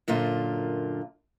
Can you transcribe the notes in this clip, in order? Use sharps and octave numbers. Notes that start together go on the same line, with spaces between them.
F#2 A#2 D3 F4